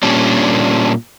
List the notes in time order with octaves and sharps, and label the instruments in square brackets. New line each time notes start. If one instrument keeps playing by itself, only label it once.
[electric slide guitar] A#2 G3 C#4 D4